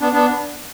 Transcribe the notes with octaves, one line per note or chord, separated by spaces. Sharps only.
B3 D4
B3 D4